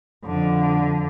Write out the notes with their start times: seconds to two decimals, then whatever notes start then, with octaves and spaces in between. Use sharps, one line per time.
0.25 F2 D3